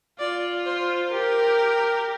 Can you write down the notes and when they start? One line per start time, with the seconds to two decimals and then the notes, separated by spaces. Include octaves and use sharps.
0.19 F4 D5
0.66 C5
1.13 G4 A#4